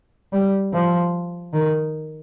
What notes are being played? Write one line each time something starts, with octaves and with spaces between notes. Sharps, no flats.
G3
F3
D#3